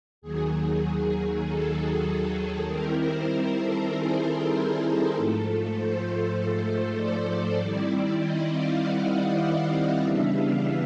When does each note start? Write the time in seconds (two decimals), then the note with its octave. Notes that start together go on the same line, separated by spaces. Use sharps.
0.22 D#2 D#3 F#3 G#4
1.45 A4
2.67 D#3 G3 C4 E4 A#4
2.98 C5
3.29 A#4
3.59 A4
3.90 G#4
4.20 G#4
4.51 A4
5.12 G#2 F3 A3
5.74 C5
6.96 D5
7.58 D#3 G3 C4 E4
8.19 D#5
8.50 F5
8.80 F#5
9.11 F#5
9.41 F#5
9.72 F5
10.03 C#3 E3 G3 B3 D4 E5
10.34 F5